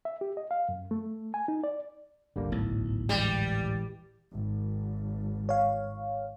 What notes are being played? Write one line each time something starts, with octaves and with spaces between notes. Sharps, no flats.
E5
G4
D#5
F5
F#2
A3
G#5
D#4
D5
G#1 D2 D3 G3 A#3
B1 A2
E3 G3 G#3
G#1
C#5 F5